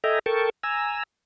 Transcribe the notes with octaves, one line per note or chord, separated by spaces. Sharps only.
A4 D#5 E5 G5 G#5 A#5
A4 A#4 G5 A5 C#6
G#5 A#5 E6